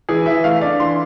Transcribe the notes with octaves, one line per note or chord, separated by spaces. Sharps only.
E3 G#4
E3 E5
A3 F5
D4 D5
E3 C6